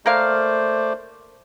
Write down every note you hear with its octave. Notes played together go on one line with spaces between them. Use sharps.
A3 A#3 A#4 C5 D5 F5